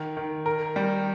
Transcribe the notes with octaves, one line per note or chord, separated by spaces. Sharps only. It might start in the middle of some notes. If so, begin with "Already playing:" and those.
Already playing: D#3
D#3
A#4
G3